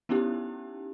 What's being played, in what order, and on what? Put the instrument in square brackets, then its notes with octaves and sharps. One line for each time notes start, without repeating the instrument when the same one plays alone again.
[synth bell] B3 C#4 D#4 E4 G4